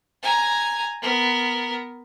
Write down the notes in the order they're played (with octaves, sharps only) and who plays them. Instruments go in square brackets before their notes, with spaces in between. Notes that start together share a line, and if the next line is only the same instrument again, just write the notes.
[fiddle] G#5 A#5
B3 A#4